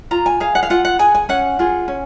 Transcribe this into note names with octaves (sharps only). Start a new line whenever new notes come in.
F4 A#5
G#5
G#4 F5
F#5
F5
F4 F#5
F#5
G#4 G#5
G#5
C#4 F#5
F4 G#4
C#4